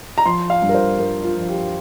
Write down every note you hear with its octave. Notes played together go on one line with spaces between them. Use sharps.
A#5
F3 C6
F5
G2
A#4
C5
G2 A#4
F4
F3
G4